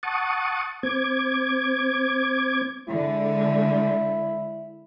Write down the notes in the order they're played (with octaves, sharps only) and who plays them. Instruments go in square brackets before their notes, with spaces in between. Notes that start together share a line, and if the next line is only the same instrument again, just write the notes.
[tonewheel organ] F#5 A5 C#6 D#6
C4 D6 G#6
[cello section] D3 G#3 [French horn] E4